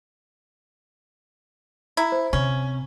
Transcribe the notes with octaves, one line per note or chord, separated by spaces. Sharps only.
E4 A#5
C5
C3 C#4